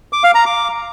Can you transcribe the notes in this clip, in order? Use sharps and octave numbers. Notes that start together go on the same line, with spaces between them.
D6
F5
A#5
D6